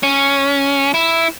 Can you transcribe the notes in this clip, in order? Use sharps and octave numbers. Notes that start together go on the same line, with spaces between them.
C#4
E4